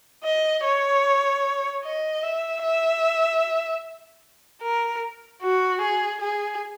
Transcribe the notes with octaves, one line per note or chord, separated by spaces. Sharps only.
D#5
C#5
D#5
E5
E5
A#4
F#4
G#4
G#4